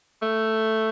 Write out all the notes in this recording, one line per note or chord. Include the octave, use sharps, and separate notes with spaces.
A3